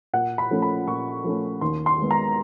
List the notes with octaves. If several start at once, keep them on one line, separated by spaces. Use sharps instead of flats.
A#2 F#5
B5
F3 A3 C#4
B5
A#2 C#6
F3 A3 C#4
D#2 C6
C6
D#3 G#3 B3
A#5